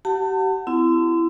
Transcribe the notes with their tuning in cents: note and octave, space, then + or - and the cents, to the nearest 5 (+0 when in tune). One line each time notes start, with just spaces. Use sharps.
G4 -35 F#5 +0 A5 +35
C4 -30 E4 +15